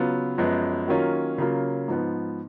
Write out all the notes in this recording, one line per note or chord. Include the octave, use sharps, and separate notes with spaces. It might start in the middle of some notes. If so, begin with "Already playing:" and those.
Already playing: C#3 F#3 B3 F4
F#2 F3 G#3 B3
D#3 F#3 A#3 C#4 F4
C#3 F#3 A#3 F4
G#2 F3 B3